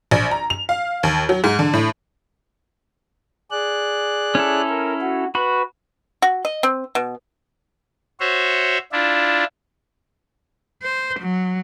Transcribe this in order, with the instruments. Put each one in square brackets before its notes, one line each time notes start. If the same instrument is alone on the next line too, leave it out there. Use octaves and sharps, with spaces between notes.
[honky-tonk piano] A#1
A#5
F7
F5
D#2
F#3
G#2
D3
A2
[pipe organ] G#4 D5 F#6
[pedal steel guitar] C#4 E4 A4
[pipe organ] A#4
F#4
[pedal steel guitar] F#4 B5 [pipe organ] B4
[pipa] F#4
D#5
C4
B2
[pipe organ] F#4 C5 C#5 E5
D4 E4 F4
[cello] C5
F#3